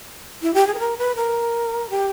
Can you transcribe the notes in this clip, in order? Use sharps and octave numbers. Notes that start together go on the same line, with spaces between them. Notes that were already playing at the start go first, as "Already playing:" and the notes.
E4
G4
G#4
B4
A#4
B4
A#4
G4